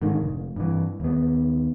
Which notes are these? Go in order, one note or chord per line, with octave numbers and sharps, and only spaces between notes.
G#2 D3 D#3
F1
G2 E3
D#2 B3